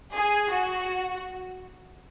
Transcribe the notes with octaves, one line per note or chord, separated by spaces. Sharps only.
G#4
F#4